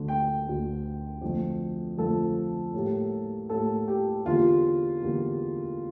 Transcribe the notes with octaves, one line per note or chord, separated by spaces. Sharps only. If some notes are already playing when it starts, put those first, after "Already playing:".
Already playing: D2 D3 A3
G5
D2 D3 A3
F2 D3 F3 A3
F2 D3 F3 A3 A4
A2 G3 A#3
A2 G3 A#3 A4
G4
E2 D3 G3 A#3 F4
E2 D3 G3 A#3